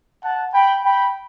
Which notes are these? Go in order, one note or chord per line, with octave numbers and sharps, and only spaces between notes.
F#5 A5
G5 B5
G5 B5